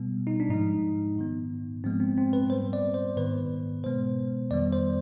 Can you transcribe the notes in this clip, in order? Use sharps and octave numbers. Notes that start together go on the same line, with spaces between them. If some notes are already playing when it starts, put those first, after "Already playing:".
Already playing: B2 G3 B3
D#4
D4
G#2 F3 G#3 D#4
G#2 D#3 B3
G#2 F3 G#3 B3 C4
C4
C4
B4
G#2 G3 B3 C5
D5
C5
G#2 D#3 B3 B4
B2 G#3 B3 C5
F2 D#3 G3 B3 D5
C5